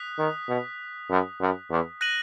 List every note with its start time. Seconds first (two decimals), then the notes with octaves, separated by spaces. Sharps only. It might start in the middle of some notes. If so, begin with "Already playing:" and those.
Already playing: D#6 F#6 B6
0.19 D#3
0.49 B2
1.10 F#2
1.41 F#2
1.70 E2
2.01 F#6 A#6 D#7 F#7